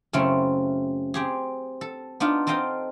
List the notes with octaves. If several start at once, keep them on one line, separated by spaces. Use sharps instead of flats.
F#2 C#3 A3 C4 C#4 E4
C4 G4 G#4
A4
B3 D4 D#4 F4
C4 A4 D#5 F5 G5 A#5